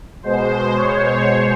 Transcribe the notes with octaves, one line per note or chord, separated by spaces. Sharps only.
B2 G#3 C5
C#5